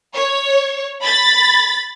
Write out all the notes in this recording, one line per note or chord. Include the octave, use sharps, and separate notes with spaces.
C#5
B5 A6